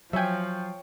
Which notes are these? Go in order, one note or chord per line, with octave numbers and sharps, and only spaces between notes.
F3 F#3 C#5 E5 G5 G#5